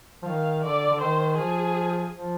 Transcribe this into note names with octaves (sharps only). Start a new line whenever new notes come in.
F3
D#3 F5
D3 D5
D3
D#3 C5
F3 G#4
F3